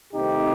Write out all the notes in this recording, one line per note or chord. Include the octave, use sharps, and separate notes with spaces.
C2 C3 D#3 A3 C4 D#4 G4